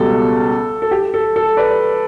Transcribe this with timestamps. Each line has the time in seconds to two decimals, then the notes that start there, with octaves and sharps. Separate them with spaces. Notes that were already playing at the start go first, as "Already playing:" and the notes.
Already playing: C#2 B2 G3 A4
0.82 A4
0.91 G4
1.14 A4
1.36 A4
1.57 B4 D5